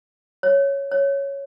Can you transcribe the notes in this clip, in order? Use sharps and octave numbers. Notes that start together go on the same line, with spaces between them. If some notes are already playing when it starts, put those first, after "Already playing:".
C#5
C#5